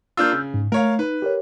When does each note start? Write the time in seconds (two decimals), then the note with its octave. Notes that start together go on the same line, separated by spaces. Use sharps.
0.17 A#3 D4 F4 E6 F6 G6
0.32 C#3
0.54 G#2
0.72 A3 A#4 C#5 F5
0.99 D#4 B4
1.22 G4 A#4 C#5